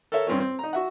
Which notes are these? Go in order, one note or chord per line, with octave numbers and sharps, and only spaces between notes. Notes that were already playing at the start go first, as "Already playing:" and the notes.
A4 A#4 C#5 E5
G2 C4 C#4 C#5
C4
D#4 A#5
F#4 E5 F#5